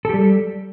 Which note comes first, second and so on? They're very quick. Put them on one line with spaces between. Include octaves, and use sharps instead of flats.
A4 G4 G3